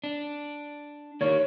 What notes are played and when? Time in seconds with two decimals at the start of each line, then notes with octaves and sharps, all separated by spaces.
0.04 D4
1.21 D#3 A#3 C#5